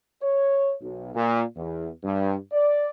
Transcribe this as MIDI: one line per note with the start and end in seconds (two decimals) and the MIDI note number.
0.22 0.73 73
0.81 1.10 35
1.14 1.42 46
1.55 1.87 40
2.03 2.35 43
2.52 2.90 74